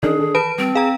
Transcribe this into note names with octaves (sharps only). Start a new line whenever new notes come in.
D#3 E3 D#4 G#4
D4 A4
B4 A5 B5 D7
G3 C4
G#4 F5 A#5